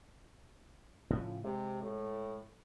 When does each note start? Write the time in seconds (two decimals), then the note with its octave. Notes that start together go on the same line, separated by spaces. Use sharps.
1.10 A2 C#3 F3
1.44 C3 G#3
1.82 A2